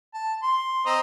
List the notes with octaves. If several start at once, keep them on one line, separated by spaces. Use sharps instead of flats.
A5
C6
C4 D#5 A#5